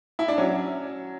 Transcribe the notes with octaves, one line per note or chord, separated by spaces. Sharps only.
E4
D4
F#3 C#4